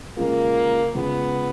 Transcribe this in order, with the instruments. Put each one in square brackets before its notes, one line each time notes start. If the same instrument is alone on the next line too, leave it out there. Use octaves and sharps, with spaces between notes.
[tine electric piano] C#3 G#3 C#4 F4 G#4 [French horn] A#3
[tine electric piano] C#3 G#3 C#4 F4 G#4 [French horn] B3